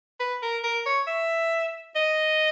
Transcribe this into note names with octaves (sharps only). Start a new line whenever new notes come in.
B4
A#4
A#4
C#5
E5
D#5